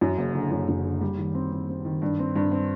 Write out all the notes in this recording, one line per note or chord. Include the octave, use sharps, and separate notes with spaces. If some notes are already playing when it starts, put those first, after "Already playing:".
F#2
F#1
D3
F#2
F#2
D3
G3
D#3
C4
C4
C4
D#3
G2
C4
G2
C4